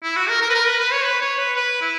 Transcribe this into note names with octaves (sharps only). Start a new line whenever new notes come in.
E4
F#4
A#4
A#4
B4
A#4
B4
B4
C#5
B4
C#5
B4
B4
E4